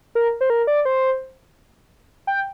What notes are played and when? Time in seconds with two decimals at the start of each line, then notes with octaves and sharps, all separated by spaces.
0.15 A#4
0.41 C5
0.50 A#4
0.67 D5
0.85 C5
2.27 G5